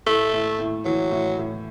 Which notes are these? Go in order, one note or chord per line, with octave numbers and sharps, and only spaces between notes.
A2 A3
A2
A2
E3 F#3
A2
A2